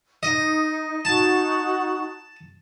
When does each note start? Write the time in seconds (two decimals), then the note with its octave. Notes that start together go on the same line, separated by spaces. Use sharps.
0.23 D#4 D#5
1.05 D#4 F#4 A5